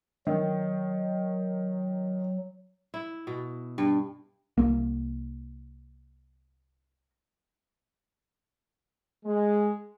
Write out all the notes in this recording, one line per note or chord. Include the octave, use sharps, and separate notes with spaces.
D#3 F#3
E4
B2
G2
C2 A#3
G#3